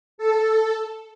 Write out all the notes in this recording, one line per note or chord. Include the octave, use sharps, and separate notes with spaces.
A4